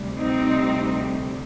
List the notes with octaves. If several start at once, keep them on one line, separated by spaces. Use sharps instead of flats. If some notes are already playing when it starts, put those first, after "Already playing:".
Already playing: D2 C3 G3
C4 D#4